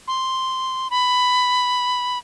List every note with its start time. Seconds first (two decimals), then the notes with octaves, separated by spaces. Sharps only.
0.08 C6
0.90 B5